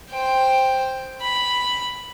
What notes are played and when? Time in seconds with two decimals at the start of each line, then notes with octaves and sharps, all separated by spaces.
0.11 C5 G5
1.21 B5